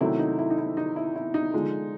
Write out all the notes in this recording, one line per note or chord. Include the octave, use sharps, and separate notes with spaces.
C3 D#3 F#3 A3 E4
D#4
E4
D#4
E4
D#4
E4
E4
D#4
D3 F3 G#3